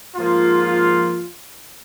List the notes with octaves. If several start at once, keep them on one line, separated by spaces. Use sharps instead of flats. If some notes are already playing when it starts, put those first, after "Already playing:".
G#2 F3 A#3 F4